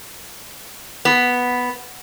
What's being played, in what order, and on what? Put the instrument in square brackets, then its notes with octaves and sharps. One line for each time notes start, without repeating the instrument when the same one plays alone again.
[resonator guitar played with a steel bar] B3